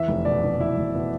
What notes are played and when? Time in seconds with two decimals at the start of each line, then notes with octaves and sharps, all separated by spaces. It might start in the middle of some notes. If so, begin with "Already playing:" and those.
Already playing: E2 E5
0.08 F1
0.25 B2 D5
0.43 F1
0.60 E2 E4
0.77 F1
0.95 B2